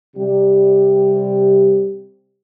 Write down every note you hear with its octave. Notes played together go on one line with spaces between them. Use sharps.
C3 G3 G4